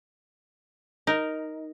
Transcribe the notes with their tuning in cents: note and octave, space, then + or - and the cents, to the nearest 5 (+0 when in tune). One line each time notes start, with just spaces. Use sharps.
D#4 +0 A#4 +0